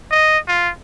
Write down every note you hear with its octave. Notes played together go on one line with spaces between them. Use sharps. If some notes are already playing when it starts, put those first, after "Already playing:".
D#5
F4